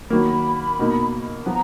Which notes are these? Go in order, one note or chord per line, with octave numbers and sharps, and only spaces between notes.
D#3 F#3 A#3 B5
B2 A#3 D#4
F3 B3 F4 A#5